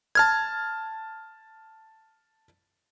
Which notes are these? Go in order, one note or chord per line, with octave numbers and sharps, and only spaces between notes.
A5 F6 G#6